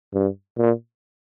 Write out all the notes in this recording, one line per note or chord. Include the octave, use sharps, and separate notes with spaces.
G2
A#2